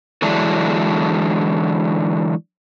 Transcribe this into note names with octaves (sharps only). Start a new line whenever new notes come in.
D3 E3 F#3 G#3 D4 E4